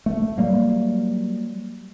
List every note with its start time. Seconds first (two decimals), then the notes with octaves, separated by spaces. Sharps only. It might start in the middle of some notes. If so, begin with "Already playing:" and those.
0.06 A3
0.38 F#3 G3 A#3